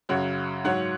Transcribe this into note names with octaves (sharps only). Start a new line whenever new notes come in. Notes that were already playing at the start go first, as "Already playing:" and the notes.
F#2 C#3 F#3 C#5 F#5
G#2 F#3 C#5 F#5